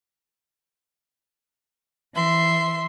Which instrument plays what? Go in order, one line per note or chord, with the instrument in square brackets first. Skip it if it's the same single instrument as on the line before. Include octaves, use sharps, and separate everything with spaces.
[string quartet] E3 E5 C6